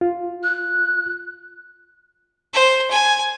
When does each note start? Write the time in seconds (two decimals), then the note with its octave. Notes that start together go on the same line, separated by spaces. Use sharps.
0.01 F4
0.43 F#6
2.53 C5
2.91 G#5